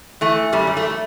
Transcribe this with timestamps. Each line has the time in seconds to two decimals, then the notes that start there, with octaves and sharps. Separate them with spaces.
0.21 E3 A3
0.52 F#2 G3
0.67 G3
0.77 A3